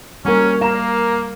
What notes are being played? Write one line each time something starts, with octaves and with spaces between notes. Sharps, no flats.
G3 A#3 C#4 F#4 A#4
A#3 F5 A#5 E7